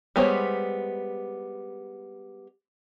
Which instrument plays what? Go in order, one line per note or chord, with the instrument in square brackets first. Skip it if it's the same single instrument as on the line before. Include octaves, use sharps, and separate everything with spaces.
[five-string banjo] G3 G#3 B3 C5 C#5